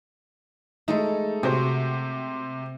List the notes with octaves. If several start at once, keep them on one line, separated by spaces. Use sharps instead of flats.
G#3 A3 D#4 A4
C3 F#4 G4 C5